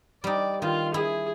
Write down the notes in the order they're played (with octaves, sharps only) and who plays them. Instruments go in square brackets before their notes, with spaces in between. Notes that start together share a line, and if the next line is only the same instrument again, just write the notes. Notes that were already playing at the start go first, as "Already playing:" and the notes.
[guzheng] G3 D#4 [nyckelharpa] D5
[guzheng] D#3 [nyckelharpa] F4
[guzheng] E4 [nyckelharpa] G#4